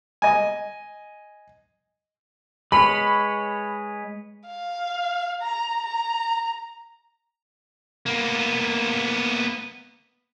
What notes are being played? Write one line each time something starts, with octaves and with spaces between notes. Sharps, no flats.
D#5 G#5
G#3 B4 C#5 B5
F5
A#5
A#5
A#3 B3